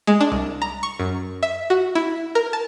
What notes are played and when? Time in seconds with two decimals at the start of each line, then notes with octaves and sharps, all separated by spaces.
0.07 G#3
0.21 D4
0.32 C2
0.62 A#5
0.83 C#6
1.00 F#2
1.43 E5
1.70 F#4
1.95 E4
2.35 A#4
2.53 A5